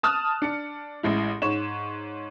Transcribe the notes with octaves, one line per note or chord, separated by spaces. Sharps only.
A5 D#6 F6 F#6
D4 C#7
A1 G#3 E4
G#2 C#5 E7